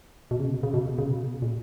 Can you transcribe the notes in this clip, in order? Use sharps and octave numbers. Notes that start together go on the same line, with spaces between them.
B2
C#3
C#3
B2
C#3
B2
A#2